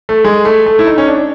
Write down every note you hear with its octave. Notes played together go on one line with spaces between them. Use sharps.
A3
G#3
A3
A3
E4
D#4
C#4
D4